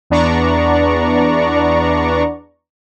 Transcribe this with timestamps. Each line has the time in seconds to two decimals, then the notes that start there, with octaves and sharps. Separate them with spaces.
0.10 E2 B3 D4 D5 A#5 C#6